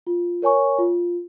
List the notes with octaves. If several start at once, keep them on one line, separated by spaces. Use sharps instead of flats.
F4
A#4 C#5 G#5 C#6
F4